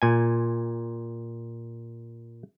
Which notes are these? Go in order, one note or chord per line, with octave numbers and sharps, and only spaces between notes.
A#2 G#5